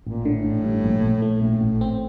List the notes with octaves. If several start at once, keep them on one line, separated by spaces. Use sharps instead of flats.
A1 A#2
A2 D3
A1
G2
A#1
A#1
A2 A3
A#1
A1
C4